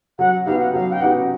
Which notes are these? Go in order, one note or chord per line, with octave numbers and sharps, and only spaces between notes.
F#3 F#5
B3 D#4 G4 F5
F#5
F#3 F5
G5
B3 D#4 G4 F#5